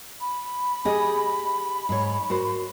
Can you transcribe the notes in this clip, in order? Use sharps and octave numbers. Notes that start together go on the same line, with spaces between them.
B5
G4 G#4 D#5
G#2 C#5
F#4 A#4 C5